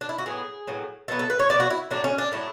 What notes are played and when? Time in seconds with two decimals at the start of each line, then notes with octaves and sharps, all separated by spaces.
0.01 D4
0.09 E4
0.18 F#4
0.26 A2 F#3 B3 G#4
0.67 A2 F#3 B3
1.08 B2 F#3 B3 A4
1.19 A4
1.30 B4
1.39 C#5
1.49 B2 F#3 B3 D5
1.60 F#4
1.70 E4
1.91 A2 F#3 A3 D4
2.04 C#4
2.18 D4
2.32 A2 F#3 A3 E4